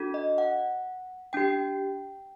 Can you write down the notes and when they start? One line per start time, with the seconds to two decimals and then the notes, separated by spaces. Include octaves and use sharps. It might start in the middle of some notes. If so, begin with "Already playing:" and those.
Already playing: D4 F#4 A4
0.14 D#5
0.38 F#5
1.33 D4 G4 G5